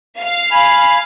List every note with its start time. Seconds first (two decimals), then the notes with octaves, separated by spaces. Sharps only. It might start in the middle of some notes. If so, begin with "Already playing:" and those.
0.20 F5
0.51 G#5 B5